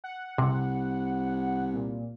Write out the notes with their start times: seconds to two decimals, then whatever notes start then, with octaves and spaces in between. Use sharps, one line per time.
0.04 F#5
0.38 C2 C3
1.74 A#2